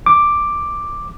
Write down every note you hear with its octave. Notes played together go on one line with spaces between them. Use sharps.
D6